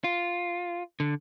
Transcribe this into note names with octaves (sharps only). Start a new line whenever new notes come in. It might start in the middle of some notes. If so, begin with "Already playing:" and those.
F4
D3